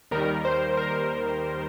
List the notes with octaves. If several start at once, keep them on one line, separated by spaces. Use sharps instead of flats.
D#2 D#3 G3 A#4
C5
A#4